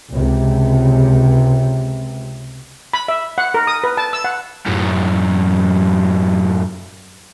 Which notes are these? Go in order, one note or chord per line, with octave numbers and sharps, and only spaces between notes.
C#2 C3
B5
E5
F#5
A#4
D#6
B4
A5
E6
F#5
F#2 A2